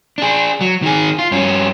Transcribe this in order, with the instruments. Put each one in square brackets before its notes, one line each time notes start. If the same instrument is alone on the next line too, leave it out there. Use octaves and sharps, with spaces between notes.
[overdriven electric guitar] D4 G#4
F#3
D#3 G#4
F4
G2 C#4